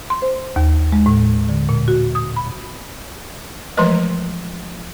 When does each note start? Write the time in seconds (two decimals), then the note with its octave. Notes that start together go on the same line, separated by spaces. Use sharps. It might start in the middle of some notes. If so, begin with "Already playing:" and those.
0.10 C6
0.22 C5
0.56 D#2
0.92 G#3
1.06 A2
1.49 D3
1.69 A#2
1.88 F#4
2.15 D#6
2.36 B5
3.77 E3 F3 G#3 A3 B4 D#5